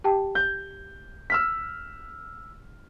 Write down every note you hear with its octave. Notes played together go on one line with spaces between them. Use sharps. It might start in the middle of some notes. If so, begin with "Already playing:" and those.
G4 G5 A5
G6
E6 F6 B6